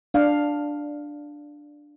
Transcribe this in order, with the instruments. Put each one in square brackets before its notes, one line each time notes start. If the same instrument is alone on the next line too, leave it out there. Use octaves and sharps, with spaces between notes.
[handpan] D4 F5